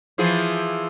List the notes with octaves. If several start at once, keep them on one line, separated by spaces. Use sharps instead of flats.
E3 F3 G#4